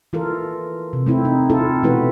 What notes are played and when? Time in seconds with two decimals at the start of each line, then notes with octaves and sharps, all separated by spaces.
0.13 E3 F4 A4 A#4
0.93 C3
1.06 A3 C4 E4
1.25 D#4
1.50 C4 E4 F4 A4
1.83 B2 E3 A3 E4 F#4 B4